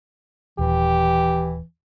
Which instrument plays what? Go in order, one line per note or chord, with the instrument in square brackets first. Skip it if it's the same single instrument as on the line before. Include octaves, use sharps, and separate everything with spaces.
[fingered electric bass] D#1 [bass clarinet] E3 [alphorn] G4